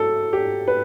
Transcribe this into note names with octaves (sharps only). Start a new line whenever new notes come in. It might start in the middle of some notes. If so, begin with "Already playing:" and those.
Already playing: F#3 A4
G4
B4